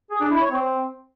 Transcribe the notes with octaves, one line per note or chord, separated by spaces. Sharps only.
G#4
D4
E4
C#5
C4